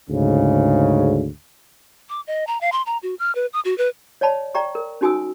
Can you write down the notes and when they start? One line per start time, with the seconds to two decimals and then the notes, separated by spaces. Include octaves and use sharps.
0.10 D2 G#2 C#3
2.09 D6
2.27 D#5
2.47 A#5
2.61 F5
2.72 C6
2.86 A#5
3.03 F#4
3.19 F6
3.35 B4
3.53 D#6
3.65 F#4
3.78 B4
4.21 C#5 D5 F#5 A5 B5
4.55 D5 G5 A#5 C#6
4.75 A#4
5.01 C#4 D#4 F#4 G#5 D#6 E6